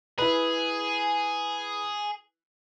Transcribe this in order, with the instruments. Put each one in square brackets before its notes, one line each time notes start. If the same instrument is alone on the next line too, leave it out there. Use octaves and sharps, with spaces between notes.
[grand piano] E4 B4 [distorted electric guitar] G#4